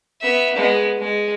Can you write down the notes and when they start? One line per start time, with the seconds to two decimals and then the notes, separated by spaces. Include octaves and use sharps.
0.22 B3 E5
0.56 G#3 B3
0.98 G#3